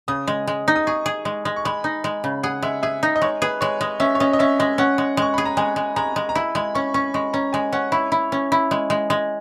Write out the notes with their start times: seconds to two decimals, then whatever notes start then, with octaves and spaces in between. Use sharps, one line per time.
0.08 C#3 D#6
0.27 G#3
0.47 G#3
0.68 D#4
0.76 D#6
0.87 G#4 C#6
1.06 G#4
1.25 G#3
1.45 G#3
1.56 C#6
1.65 G#3 B5
1.84 D#4
2.04 G#3
2.24 C#3
2.43 G#4 F#5
2.62 G#3 E5
2.83 G#4 E5
3.03 D#4
3.16 D#5
3.22 G#3 C#5
3.42 G#4 B4
3.61 G#3 C#5
3.81 G#3 D#5
4.00 C#4 E5
4.15 C#5
4.20 C#4 D#5
4.33 D#5
4.39 C#4 E5
4.59 G#3 D#5
4.78 C#4 F#5
4.98 G#3
5.17 G#3 C#6
5.34 G#4 B5
5.45 A#5
5.57 G#3 G#5
5.76 G#3
5.96 G#3 A#5
6.16 G#3
6.29 A#5
6.35 E4 B5
6.55 G#3 B5
6.75 C#4 C#6
6.94 C#4 C#6
7.14 G#3 C#6
7.33 C#4 A#5
7.53 G#3 G#5
7.73 C#4 F#5
7.92 E4 C#5
8.12 E4
8.32 C#4
8.52 E4
8.71 G#3
8.90 G#3
9.10 G#3